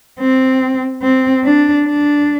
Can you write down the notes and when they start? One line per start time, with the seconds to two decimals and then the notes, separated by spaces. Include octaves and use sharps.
0.20 C4
1.02 C4
1.44 D4
1.86 D4